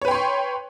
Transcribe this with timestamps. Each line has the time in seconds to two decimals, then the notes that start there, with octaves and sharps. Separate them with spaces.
0.02 C#5
0.05 B4
0.08 G5
0.11 C6
0.14 C#6